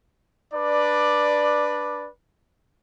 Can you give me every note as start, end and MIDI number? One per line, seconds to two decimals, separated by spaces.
0.54 2.08 62
0.54 2.08 71
0.54 2.08 74